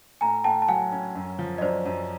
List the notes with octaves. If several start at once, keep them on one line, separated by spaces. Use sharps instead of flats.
A2 G#5 A#5
A2 G5 A5
A5
F#3 F#5 G#5
C#4
F#2
F3
D#5
F#2 C5 D5
F#2